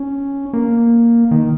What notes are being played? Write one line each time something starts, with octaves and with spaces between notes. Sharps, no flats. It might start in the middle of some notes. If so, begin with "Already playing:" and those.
Already playing: C#4
A#3
D#3